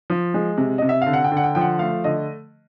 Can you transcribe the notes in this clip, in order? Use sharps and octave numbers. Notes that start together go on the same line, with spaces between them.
F3
G#3
C3
C3 D#5
E5
D3 F5
F#5
G5
D3
F#5
G5
F3 G5
F#5
A3 F5
D3 D#5